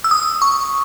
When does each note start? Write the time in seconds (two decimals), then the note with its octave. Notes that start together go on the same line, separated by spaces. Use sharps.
0.04 E6
0.11 D#6
0.42 C#6